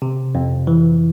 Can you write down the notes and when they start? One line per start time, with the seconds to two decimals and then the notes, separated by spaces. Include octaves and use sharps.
0.02 C3
0.35 F2
0.67 E3